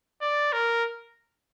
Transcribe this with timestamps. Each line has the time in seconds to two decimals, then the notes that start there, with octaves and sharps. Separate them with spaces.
0.22 D5
0.53 A#4